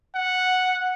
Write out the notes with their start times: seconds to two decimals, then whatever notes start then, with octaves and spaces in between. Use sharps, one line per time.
0.15 F#5